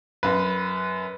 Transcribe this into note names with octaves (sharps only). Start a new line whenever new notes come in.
F#2 B4